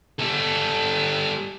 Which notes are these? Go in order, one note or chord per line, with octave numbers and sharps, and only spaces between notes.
G3 A4